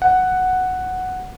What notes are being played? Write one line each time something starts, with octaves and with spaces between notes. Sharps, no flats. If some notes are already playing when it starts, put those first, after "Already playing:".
F#5